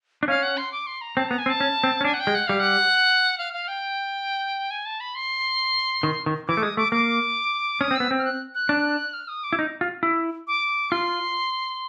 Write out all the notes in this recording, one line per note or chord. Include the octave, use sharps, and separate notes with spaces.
D4
C#4 F5
F#5
C6
D6
C6
A#5
C4 A5
B3 A#5
G#5
C4
A5
C#4
C4
C#4
D4 G#5
F#5
G5
G#3
F#5
G3 F5
F#5
F5
F5
G5
G#5
A5
B5
C6
D#3
D#3
E3 D6
A3
G#3 D#6
A3 D6
A#3 D6
C#4 D#6
C4
B3 E6
C4
F6
F#6
F#6
D4
F6
D#6
D6
E4
D#4
F4
E4
D6
F4 C6